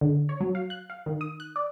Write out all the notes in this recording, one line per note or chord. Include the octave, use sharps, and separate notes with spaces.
D3
C#5
F#3
F5
F#6
F5
D#3
D#6
F#6
D5